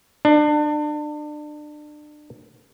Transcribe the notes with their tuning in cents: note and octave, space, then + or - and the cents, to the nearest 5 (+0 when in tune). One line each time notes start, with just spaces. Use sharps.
D4 +30